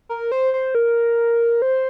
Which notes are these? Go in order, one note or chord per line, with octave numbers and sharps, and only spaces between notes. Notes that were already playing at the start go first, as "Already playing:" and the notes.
A#4
C5
C5
A#4
C5